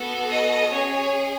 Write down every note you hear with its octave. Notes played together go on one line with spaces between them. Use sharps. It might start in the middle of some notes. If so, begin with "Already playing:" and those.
Already playing: B3 F#4 A4
D#5
C#4 G#4 C#5